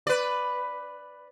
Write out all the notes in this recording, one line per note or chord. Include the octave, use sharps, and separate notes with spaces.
B4 D5